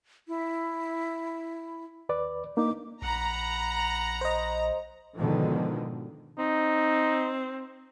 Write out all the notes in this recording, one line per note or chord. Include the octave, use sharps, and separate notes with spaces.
E4
D#2 B4 D5
A#3 D4 D#4 D6
A#1 F#5 A#5 B5
C5 D#5
G#2 B2 D3 D#3 F3
C4 D#4